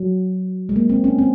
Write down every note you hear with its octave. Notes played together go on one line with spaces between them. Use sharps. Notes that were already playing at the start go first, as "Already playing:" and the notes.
Already playing: F#3
G#3
A#3
C4
C#4
C4